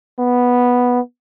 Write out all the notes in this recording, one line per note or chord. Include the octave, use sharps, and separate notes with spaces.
B3